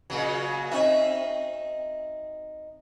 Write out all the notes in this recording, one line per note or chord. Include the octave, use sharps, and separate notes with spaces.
A#2 C#3 F#3
C4 D#4 E5